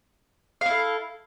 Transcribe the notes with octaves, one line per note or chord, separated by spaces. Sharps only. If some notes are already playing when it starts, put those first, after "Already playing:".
E4 A4 F5